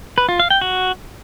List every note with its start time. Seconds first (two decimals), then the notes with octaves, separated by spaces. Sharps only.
0.18 B4
0.29 F4
0.40 F5
0.50 G5
0.61 F#4